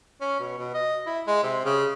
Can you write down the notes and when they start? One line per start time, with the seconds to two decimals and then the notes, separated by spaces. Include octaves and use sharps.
0.21 C#4
0.40 B2
0.58 B2
0.74 D#5
1.06 E4
1.27 G#3
1.43 C3
1.65 C#3